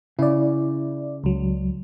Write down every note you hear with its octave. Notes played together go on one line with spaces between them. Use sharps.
C#3 E4 D5
C#2 F#3